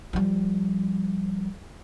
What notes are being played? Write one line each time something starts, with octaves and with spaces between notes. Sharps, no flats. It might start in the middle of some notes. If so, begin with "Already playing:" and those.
F3 G3